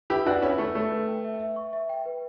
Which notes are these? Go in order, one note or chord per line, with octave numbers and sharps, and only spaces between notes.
E4 G4 B4
D4 F#4 B4
C#4 E4 B4
A3 C#6
A3 E5
B4
G5
E5
E5
C#6
E5
G5
B4